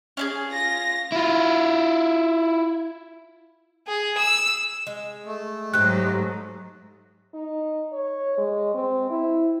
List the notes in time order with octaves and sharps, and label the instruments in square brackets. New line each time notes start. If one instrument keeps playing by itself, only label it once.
[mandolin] C#4 D4 G#4
[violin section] F4 A#6
[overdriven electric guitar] E4 F4
[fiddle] G#4
E6
[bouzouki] G#3
[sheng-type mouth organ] A3
[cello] G#2 F#3 [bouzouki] G4 C5 [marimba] F#6
[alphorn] D#4
C#5
G#3
C4
E4